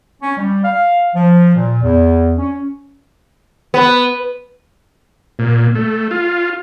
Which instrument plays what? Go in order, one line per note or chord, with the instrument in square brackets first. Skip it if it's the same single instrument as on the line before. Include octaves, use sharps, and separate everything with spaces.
[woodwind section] C#4
G3
F5
F3
A#2
E2
C#4
[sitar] B3
[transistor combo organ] A#2
A3
F4